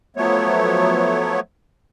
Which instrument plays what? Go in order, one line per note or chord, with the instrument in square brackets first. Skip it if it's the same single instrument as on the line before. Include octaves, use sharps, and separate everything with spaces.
[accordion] F3 F#3 A3 B3 C#5